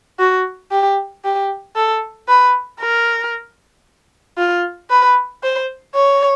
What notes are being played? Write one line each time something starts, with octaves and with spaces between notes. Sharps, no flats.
F#4
G4
G4
A4
B4
A#4
F4
B4
C5
C#5